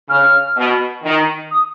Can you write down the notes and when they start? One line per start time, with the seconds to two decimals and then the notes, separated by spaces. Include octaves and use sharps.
0.09 C#3 F6
0.57 B2
1.04 D#3
1.51 D#6